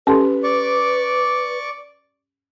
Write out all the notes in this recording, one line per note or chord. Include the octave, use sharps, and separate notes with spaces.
C#4 G4 A4 B4 C6
D5 C#6 D6